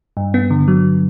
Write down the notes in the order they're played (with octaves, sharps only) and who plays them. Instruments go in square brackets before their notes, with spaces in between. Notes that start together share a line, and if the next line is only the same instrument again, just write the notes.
[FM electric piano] G2
B3
D3
F#3